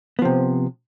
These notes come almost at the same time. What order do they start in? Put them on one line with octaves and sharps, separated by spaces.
B3 F3 C3